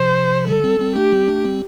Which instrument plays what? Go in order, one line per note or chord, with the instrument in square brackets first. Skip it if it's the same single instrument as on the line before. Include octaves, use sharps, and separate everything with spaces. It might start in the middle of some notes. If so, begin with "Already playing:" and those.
Already playing: [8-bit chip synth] C3 F3 [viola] C5
[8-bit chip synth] D3 G3 [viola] A4
[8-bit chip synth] G3 C4
G3 C4
[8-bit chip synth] A3 D4 [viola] G4
[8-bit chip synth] G3 C4
A3 D4
G3 C4